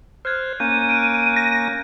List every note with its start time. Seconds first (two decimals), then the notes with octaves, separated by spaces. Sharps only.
0.25 C5 F6 F#6 G#6
0.60 A#3 C#4 G6 D#7
0.89 F#6 D7
1.36 A#6